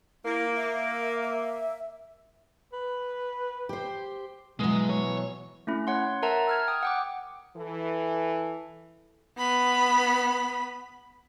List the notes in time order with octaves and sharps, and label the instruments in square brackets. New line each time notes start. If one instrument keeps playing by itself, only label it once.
[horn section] A#3 [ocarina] E4
[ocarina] E5
E5
[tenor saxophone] B4
[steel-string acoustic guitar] G4 C5
[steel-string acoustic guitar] B2 F#3 [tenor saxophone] E3 [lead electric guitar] G#3
[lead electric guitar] C#5
[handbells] A3 C#4 E4
C#5 F#5 C6
A#4 E5 F#5 A5 A#5
E6 F6 G#6
G5 D#6
F#5 G5 D6
[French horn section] E3 A4
[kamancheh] B3 B5